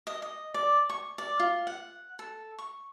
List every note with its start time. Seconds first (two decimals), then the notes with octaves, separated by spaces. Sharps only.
0.07 D#5
0.22 D#5
0.54 D5
0.89 C#6
1.18 D5
1.40 F4
1.67 F#5
2.19 A4
2.59 C#6